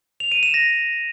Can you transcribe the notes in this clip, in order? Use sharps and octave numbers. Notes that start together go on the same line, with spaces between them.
F7
D#7
E7
A#6